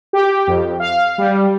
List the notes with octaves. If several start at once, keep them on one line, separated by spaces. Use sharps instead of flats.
G4
F2
F5
G3